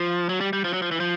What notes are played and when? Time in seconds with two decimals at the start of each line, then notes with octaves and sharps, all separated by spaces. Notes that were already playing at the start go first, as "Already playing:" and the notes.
Already playing: F3
0.29 F#3
0.41 G3
0.53 G3
0.64 F3
0.73 F#3
0.82 F3
0.91 E3
1.00 F3